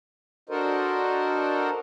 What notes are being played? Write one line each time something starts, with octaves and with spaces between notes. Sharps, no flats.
D4 F#4 A4 A#4 C5 D#5